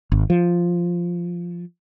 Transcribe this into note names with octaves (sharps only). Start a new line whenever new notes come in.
G#1
F3